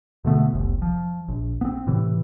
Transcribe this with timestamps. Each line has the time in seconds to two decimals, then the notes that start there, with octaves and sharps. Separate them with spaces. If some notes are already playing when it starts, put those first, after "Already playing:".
0.25 B2 D3 A3 B3
0.53 F1 C2
0.82 F3
1.28 A#1
1.61 B3 C4
1.87 A2 C3 E3